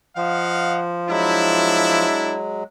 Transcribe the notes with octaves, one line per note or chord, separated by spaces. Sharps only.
F3 D#5 F5 F#5
F#3 G#3 D4 E4